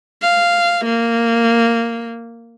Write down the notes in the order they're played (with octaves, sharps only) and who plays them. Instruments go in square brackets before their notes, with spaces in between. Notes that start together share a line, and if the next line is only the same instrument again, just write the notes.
[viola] F5
A#3